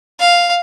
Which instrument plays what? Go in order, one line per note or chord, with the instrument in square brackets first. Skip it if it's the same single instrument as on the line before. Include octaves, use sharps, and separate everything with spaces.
[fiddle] F5